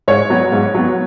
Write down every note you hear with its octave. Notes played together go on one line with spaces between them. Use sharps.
G#2 C#5
F#3 B3
G#2
F#3 B3